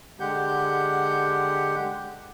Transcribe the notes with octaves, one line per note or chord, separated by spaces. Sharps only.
D3 G#3 G4 F#5 G6